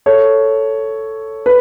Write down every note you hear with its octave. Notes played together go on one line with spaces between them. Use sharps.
A4 C#5
B4